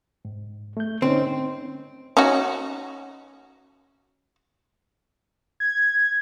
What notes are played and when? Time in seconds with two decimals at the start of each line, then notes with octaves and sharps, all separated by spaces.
0.25 G#2
0.77 A3 G6
1.02 D3 C4 C#4 D#4
2.17 C#4 D#4 F#4
5.60 G#6